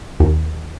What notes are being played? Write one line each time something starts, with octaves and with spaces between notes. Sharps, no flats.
D#2